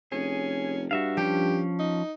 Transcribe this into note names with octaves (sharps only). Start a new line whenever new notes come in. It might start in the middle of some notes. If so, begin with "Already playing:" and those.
F1 C#4 G#4
G2 F#4 E5 F5
F3 C#4 G4
D#4